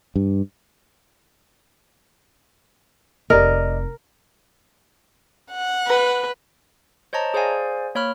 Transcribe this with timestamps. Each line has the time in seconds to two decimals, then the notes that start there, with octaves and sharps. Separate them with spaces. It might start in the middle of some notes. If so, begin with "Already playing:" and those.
0.16 G2
3.30 F1 D#4 G4 A#4 D5 D#5
5.52 F#5
5.87 B4
7.13 C5 C#5 D#5 A5 A#5
7.34 G#4 C5 D5 F5 G#5
7.95 A#3 C#5 B5 F6